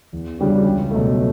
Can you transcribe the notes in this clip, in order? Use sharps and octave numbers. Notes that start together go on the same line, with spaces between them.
E2
C#3 G3 D4 F#4
C#2
B2 F#3 A3